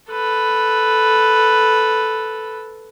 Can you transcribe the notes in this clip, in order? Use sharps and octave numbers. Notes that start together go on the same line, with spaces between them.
A4 B4